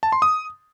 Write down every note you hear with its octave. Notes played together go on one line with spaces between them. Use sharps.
A5
C6
D#6